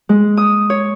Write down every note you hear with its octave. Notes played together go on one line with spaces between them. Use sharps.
G#3
D#6
C#5